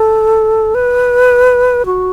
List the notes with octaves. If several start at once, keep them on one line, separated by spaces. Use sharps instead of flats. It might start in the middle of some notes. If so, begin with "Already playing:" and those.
Already playing: A4
B4
F#4